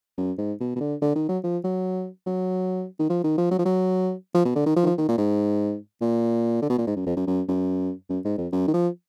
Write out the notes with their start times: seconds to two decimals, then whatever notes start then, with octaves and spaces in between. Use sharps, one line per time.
0.18 F#2
0.38 G#2
0.60 B2
0.76 B2
0.80 D3
1.02 D3
1.15 D#3
1.29 F#3
1.43 F3
1.64 F#3
2.26 F#3
2.99 D#3
3.10 F3
3.24 D#3
3.38 F3
3.51 F#3
3.59 F3
3.65 F#3
4.34 F3
4.45 B2
4.55 D3
4.66 D#3
4.77 F3
4.83 D#3
4.87 F3
4.98 D#3
5.09 A#2
5.18 G#2
6.01 A#2
6.62 D3
6.70 B2
6.78 A#2
6.87 G#2
6.96 F#2
7.06 F2
7.17 F#2
7.27 F#2
7.48 F#2
8.10 F#2
8.25 G#2
8.38 F2
8.52 F#2
8.68 D#3
8.73 F3